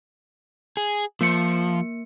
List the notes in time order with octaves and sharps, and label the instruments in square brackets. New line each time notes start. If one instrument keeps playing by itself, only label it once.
[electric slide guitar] G#4
[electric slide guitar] F3 [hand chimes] A#3 C#7